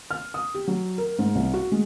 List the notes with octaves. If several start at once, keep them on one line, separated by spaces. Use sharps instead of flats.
F6
D#6
G4
F#3
A#4
G#2
C2
F#4
G#3